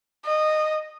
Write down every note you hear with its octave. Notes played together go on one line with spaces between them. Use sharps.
D#5